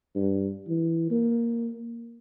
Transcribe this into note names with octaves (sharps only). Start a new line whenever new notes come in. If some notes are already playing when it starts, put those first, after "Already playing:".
G2
E3
A#3